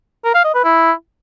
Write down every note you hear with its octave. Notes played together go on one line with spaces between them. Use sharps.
A#4
F5
D#5
B4
E4